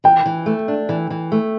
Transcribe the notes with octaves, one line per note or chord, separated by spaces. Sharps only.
E3 G5
E3
A3
D4
E3
E3
A3